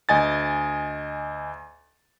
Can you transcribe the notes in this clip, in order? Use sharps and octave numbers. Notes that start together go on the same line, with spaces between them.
D2 D#5 G#5 A6